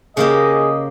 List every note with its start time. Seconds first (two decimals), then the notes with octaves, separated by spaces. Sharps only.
0.17 C#3 A#3 G4 G#4 D#5